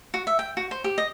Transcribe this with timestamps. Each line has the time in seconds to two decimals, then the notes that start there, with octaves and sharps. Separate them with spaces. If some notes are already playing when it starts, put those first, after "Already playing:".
0.14 F#4
0.27 E5
0.39 G5
0.57 F#4
0.71 C5
0.84 G4
0.98 D#5